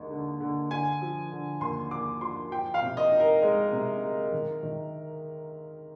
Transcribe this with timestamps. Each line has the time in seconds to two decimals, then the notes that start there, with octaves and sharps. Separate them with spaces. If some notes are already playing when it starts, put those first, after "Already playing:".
Already playing: D#2 D3 G#3 D#4
0.11 D3
0.40 D3
0.70 D3 G#5
1.01 F3
1.32 D3
1.61 D#2 C6
1.91 D#2 D6
2.21 F3 C6
2.51 F3 G5
2.74 F5
2.82 C3
2.97 D#5
3.12 D#4
3.20 A#4
3.42 G#3
3.72 C3
4.02 G#3
4.32 D#3
4.63 D#3